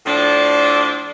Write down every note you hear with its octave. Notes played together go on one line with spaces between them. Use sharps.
A2 F3 D4